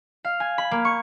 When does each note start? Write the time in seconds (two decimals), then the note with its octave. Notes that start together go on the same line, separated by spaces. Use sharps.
0.25 F5
0.40 G#5
0.58 B5
0.71 A#3
0.85 C#6